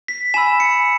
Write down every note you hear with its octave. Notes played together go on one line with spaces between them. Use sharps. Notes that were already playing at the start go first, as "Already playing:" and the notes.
B6
G#5 B5 E6 E7
C#7